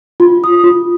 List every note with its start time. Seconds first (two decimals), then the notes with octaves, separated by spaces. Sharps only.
0.20 F4
0.44 D#6
0.64 F4